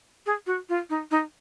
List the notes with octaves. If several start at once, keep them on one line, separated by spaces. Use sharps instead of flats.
G#4
F#4
F4
D#4
D#4